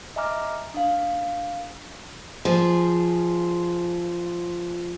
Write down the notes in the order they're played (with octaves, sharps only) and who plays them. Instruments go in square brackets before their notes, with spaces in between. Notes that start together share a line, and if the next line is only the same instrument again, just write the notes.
[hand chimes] D#5 E5 G#5 A#5 D6 F6
D4 F5
[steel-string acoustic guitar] F3 G#4